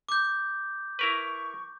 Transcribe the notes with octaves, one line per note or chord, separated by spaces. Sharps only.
D6 G6
E4 A#4 B4 C#6